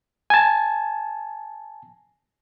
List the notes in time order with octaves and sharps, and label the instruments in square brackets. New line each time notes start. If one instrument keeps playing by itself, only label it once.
[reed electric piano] G#5 A5